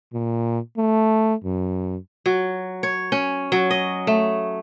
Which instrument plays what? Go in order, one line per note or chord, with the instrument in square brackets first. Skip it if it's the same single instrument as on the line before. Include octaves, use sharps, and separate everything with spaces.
[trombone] A#2
A3
F#2
[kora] F#3
C#5
C#4
F#3
D#5
A3